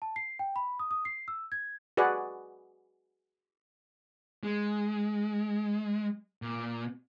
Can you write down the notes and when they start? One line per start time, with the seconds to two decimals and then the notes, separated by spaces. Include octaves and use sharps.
0.02 A5
0.16 C7
0.39 G5
0.56 B5
0.79 D#6
0.91 D#6
1.05 C7
1.28 E6
1.52 G#6
1.97 F#4 G#4 B4 D5 F#5
4.43 G#3
6.42 A#2